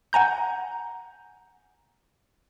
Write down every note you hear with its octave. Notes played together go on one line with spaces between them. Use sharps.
F#5 G#5 A#5 G6